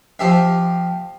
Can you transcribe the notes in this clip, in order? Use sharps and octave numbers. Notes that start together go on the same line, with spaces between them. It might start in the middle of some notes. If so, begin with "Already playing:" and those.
F3 G4 E5